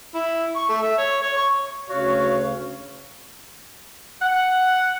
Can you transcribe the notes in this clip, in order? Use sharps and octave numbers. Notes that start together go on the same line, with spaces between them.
E4
C#6
A3
E5
C#5
C#5
C#6
D2 C#3 F#4 C#5 F5
F#5